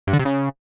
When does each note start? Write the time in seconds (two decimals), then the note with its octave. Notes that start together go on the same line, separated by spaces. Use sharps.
0.07 G2
0.13 D3
0.19 C3
0.25 C#3